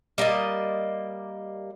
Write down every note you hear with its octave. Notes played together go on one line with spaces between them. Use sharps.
G3 A#3 D5 D#5